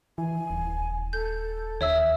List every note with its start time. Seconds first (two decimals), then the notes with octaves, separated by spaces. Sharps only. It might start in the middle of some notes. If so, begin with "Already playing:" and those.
0.18 E3 G#5
0.50 D#1
1.13 A4 G6
1.81 D#2 C#5 E5 E6